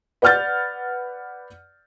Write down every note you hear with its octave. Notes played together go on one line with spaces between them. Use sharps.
B4 D5 F#5 F6 G6 A6